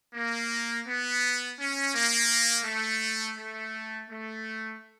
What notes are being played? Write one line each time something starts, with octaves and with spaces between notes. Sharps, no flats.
A#3
B3
C#4
A#3
A3
A3
A3